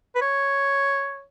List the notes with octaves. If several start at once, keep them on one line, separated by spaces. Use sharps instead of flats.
B4
C#5